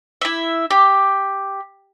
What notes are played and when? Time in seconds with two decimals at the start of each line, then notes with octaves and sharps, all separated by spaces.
0.22 E4 E5
0.71 G4